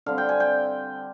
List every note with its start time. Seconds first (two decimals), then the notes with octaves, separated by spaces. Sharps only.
0.06 D3 G3 C4 F5
0.18 G5
0.29 G#5
0.40 G5